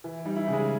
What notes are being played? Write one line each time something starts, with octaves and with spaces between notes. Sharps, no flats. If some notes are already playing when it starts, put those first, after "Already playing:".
E3
G3 D#4
E4
C#3
G#3 G#4